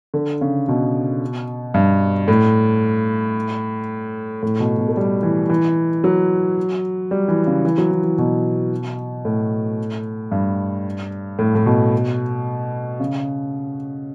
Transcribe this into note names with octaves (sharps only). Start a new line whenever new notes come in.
D3
C#3
B2
G2
A2
A2
B2
B2
A3
G3
E3
E3
F#3
G3
E3
C#3
E3
F#3
E3
E3
B2
A2
G2
A2
A2
B2
C#3